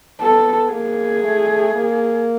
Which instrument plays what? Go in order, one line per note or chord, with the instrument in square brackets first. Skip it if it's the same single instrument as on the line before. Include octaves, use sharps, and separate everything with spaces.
[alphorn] B3 [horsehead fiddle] A4
[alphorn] A#3 [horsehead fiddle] G#4
[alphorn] A3
A#3